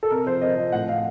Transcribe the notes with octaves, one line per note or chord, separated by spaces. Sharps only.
A4
C3 A#4
F3 C5
C3 D#5
F3
A2 F#5
F3 F5